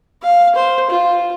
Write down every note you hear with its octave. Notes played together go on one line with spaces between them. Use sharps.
F5
C5
F4